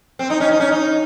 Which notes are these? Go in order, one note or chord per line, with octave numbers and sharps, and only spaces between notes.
C4
D#4
C#4
D#4
C#4
D#4